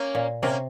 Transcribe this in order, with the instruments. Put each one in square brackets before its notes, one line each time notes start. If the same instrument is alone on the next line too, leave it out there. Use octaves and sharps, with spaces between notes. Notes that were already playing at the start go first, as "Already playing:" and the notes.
Already playing: [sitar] A#3 C#4
[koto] A#2
[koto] C3 [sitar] A#3 C#4